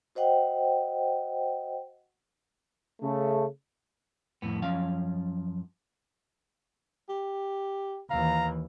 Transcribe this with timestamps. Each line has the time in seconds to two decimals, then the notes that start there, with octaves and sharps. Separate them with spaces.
0.15 F#4 C5 D#5 F#5 G5
3.01 C#3 A3
4.42 F2 A2 B3
4.62 F#2 F3 C#4 F5
7.09 G4
8.10 D#2 E3 F5 A#5